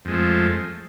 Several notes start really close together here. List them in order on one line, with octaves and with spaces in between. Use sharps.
F2 G#3 A3 F3